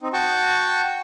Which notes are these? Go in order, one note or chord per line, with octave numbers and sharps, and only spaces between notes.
C4 D#4
F#4 G5 A5 C#6